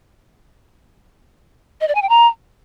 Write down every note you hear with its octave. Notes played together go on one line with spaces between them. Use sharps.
D#5
D5
G#5
G5
A#5